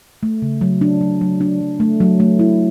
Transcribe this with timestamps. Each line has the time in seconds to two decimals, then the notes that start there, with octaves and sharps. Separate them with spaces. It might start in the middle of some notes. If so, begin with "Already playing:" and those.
0.23 A3
0.42 C#3
0.61 F#3
0.81 D4
1.01 F#3
1.21 F#3
1.41 D4
1.61 F#3
1.80 A3
2.00 F#3
2.20 A3
2.39 E4